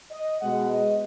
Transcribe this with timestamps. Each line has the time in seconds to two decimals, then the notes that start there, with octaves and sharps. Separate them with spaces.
0.11 D#5
0.41 B2 G#3 F#5
0.70 D#5